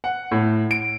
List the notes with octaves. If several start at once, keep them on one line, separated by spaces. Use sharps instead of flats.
F#5
A2
D7